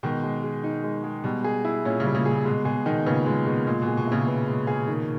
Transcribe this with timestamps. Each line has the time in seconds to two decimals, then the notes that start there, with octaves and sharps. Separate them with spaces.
0.03 B2 D#3 G#3
0.23 G#3
0.43 G#4
0.64 D#4
0.84 G#3
1.04 G#3
1.24 B2 G3
1.44 G#4
1.65 E4
1.85 A#2 C#4
2.00 A#2 C#3
2.05 G3
2.15 A#2 C#3
2.26 A#2 G#4
2.45 B2 G#3
2.65 B2 G#4
2.86 B2 D#3 D#4
3.06 A#2 C#3 B3
3.26 A#2 G#3
3.46 B2 G#4
3.67 A#2 G#3
3.82 B2
3.87 G#4
3.97 B2
4.07 A#2 C#3 E4
4.27 B3
4.47 G#3
4.67 G#4
4.88 D#3